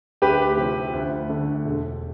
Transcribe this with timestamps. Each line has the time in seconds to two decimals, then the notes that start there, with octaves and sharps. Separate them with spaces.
0.22 D2 G4 B4
0.57 C3 F3 C4
0.93 D2
1.29 D3 A3
1.65 E1